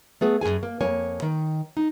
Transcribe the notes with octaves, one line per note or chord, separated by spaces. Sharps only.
A3 B3 G#4
F#2 A#2 G#4 G#5
A#3
F2 A#3 C#5 G#5
D#3
D#4